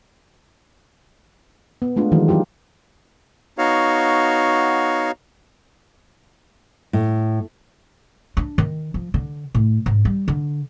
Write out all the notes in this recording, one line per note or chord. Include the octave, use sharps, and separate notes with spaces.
B3
G#3 A3 D4 F4
D#3 E3 F#3 G#3 D#4
F#3 D#4 F4 G4
B3 D#4 F#4 C#5 F5
A2
D4
D#3
F3
D3
A2
G#2
G3
D3